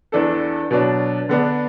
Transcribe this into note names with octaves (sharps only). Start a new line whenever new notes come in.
E2 E3 D4 A4
B2 F#3 D4
D3 B3 D4